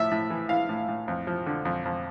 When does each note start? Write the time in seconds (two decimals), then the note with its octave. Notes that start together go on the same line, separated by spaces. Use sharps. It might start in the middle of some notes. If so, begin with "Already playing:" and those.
Already playing: A2 F3 E5
0.11 A2
0.30 E3
0.49 E3 F5
0.69 A2
0.88 A2
1.08 F2
1.27 F3
1.46 D3
1.65 F2
1.85 F2